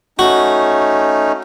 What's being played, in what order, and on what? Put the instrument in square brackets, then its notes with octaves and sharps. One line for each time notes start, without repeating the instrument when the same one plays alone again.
[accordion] A3 C#4 D#4 [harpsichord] F#4